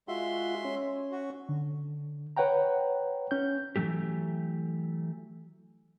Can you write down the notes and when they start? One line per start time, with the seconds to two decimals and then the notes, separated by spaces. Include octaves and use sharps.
0.08 G#3 F4 F#4 E5 C6
0.65 C#4
1.12 F#4
1.49 D3
2.37 B4 C#5 F#5 G5 A#5
3.31 C#4 G6
3.76 E3 F#3 A3 G4